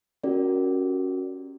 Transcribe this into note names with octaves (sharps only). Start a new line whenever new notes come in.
C#4 F#4 G4 A#4 D5